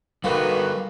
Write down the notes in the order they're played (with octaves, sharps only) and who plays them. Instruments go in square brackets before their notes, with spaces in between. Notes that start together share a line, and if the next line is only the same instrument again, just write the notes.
[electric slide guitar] G3 A4 [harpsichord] A#3 [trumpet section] D#4 F#4 B4